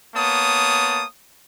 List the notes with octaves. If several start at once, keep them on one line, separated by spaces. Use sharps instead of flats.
A#3 B3 C#5 A5 D#6